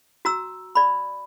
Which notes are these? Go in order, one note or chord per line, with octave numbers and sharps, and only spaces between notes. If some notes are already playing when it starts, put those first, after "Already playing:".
F#4 A#5 E6
D5 B5